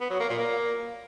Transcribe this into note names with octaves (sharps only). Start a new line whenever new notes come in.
B3
F#3
A#3
A#2
A#3